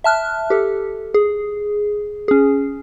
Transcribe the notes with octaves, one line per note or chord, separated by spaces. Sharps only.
E5 A5 F6 F#6
G4 A4
G#4
C#4 G#4